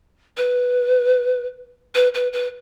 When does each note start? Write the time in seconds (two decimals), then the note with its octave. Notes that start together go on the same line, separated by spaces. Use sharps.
0.37 B4
1.95 B4
2.14 B4
2.33 B4